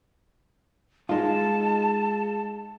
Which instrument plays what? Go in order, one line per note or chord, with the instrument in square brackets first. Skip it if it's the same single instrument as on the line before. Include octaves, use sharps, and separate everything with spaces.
[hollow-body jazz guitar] G#3 D#4 F4 [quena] A5